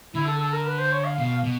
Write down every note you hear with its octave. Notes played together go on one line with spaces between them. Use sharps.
D3 E4
A4
A4
A#4
B4
C5
C#5
F5
B2 F5
B2